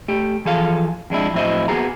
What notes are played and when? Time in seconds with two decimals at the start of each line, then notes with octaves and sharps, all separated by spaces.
0.08 A3 G4
0.45 E3 F3 G#4 A4 F5
1.10 F2 G#3 D4 E4
1.34 F2 A2 F#3 E4 C5 D#5
1.68 A#3 B3 F#4 G#4 A#5